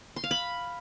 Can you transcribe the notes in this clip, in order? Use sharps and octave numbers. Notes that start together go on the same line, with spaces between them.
C6
F5
B5